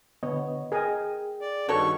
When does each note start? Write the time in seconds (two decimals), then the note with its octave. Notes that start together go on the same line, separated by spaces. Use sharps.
0.23 D3 B3 C#5 D#5
0.72 G#4 A#4 D#5 G5 G#5
1.41 D5
1.69 G2 D#3 F#4 A4 C#5 C#6